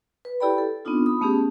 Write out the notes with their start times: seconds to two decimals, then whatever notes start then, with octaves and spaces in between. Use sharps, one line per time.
0.25 B4
0.40 E4 G4 A4 D5 G5 B5
0.58 A4
0.85 B3 C4 D4 D#4 F4
1.06 B5 D#6
1.21 A3 B3 C#4 G4 G#4